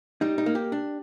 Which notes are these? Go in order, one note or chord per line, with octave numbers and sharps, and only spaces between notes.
G3 D#4
D#4
A#3
G4
D4